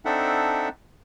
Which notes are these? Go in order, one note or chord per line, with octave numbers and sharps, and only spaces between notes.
C4 D4 D#4 A4 E5 F#5